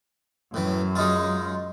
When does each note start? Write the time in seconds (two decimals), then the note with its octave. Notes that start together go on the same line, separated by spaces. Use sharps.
0.54 F#2 A2 E3
0.95 G#3 D#4 F4